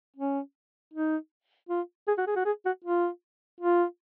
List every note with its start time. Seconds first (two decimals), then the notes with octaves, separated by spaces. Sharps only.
0.17 C#4
0.94 D#4
1.69 F4
2.08 G#4
2.18 F#4
2.27 G#4
2.36 F#4
2.45 G#4
2.65 F#4
2.84 F4
3.61 F4